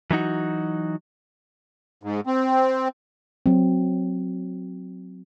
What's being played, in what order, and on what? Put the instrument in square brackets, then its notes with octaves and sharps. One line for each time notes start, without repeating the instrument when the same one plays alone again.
[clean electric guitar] E3 F#3 D#4 F#4
[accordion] G#2
C4
[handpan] F#3 C4